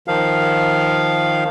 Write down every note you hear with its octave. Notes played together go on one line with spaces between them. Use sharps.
D#3 F3 F5